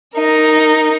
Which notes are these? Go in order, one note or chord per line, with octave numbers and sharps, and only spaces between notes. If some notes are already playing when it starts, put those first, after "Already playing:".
D#4 A#4